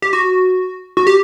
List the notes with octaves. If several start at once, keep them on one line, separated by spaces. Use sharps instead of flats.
G4
F#4
F#4
G4